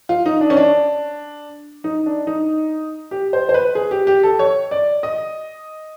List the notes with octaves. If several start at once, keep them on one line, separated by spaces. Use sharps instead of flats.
F4
D#4
D4
C#4
D4
D#4
D4
D#4
G4
C5
C5
B4
G#4
G4
G4
A4
C#5
D5
D#5